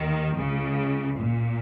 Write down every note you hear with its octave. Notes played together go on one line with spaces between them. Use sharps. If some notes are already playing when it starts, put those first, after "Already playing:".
Already playing: D#2 D#3
C#2 C#3
A#2